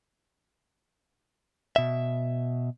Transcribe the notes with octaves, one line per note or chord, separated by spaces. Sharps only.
B2 E5